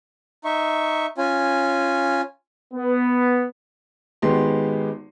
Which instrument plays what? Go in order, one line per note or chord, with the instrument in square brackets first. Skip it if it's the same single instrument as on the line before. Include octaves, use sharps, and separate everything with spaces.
[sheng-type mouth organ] D#4 E5 C#6
C#4 F4 G#5
[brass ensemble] B3
[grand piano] G#1 G#3 B3 G4 C6